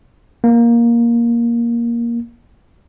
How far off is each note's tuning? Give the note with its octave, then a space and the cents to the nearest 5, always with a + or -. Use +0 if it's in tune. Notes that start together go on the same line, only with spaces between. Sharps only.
A#3 +10